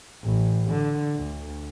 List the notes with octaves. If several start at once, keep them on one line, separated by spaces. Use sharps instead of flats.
A1
D3
D2